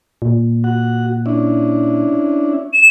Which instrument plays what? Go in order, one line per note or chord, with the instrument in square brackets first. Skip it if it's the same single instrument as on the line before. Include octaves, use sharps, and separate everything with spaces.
[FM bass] A#2
[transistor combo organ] F#4 F#5
C#4 D4 E4
[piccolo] E7